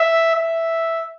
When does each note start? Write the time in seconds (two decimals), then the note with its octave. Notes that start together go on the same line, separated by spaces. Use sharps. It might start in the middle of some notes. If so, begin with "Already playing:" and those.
Already playing: E5
0.35 E5